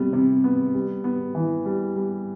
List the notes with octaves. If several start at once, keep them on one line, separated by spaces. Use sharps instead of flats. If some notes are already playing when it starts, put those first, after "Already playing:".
Already playing: C3 G3 B3
C3
B3
G3
B3
E3
G3
G3